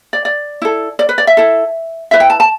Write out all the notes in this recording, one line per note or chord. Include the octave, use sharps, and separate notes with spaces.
D5
D5
E4 A4
D5
B4
D5
E5
E4 A4
E4 B4 E5
G5
A5
A5